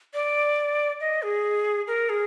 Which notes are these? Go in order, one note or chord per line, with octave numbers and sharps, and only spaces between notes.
D5
D#5
G#4
A#4
G#4